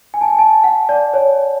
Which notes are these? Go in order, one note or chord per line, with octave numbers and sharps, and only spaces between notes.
G#5
A5
G#5
A5
F#5
D5
C#5